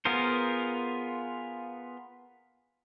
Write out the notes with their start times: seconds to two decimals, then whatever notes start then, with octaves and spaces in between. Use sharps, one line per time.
0.05 B3 F4 G#4 A#4 C5